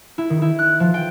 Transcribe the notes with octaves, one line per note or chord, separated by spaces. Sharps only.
E4
D#3
E4
F#6
F3
G5